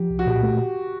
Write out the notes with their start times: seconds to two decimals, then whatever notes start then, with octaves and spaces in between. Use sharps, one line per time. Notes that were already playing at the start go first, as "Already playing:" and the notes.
Already playing: F3 G4
0.10 C2
0.19 F#4
0.26 A#2 G4
0.43 A3